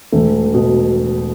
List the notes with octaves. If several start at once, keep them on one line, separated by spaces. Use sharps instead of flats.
E1 A3
B2